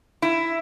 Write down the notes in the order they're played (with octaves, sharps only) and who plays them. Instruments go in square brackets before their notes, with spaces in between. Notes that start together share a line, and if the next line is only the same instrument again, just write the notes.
[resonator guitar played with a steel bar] E4